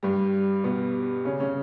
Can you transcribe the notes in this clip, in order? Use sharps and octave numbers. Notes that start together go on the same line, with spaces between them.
G2 G3
B2 B3
C#3 C#4
C#3 C#4